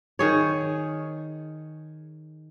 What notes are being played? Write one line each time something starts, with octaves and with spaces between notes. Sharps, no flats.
D#3 G#4 C#5